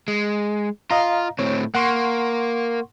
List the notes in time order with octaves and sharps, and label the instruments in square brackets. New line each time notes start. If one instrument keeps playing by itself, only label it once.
[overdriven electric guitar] G#3
[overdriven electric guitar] F4 [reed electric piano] D#5 F5 A#5
[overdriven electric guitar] A2 C4 [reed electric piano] C#5
[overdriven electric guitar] A#3 [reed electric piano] F#5 C6 C#6